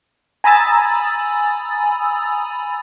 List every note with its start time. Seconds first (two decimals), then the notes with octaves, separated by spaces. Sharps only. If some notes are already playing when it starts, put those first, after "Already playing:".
0.44 G#5 A#5 B5 D#6 E6 A6